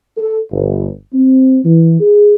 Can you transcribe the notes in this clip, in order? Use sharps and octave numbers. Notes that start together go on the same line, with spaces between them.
A4
G1
C4
E3
G#4